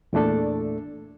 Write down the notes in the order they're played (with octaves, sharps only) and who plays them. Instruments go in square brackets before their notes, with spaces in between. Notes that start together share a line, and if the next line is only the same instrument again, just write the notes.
[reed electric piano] E2 A#2 A3 D4 A4